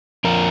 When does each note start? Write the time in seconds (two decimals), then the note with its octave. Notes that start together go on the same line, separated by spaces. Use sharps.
0.24 F2 F3 A#4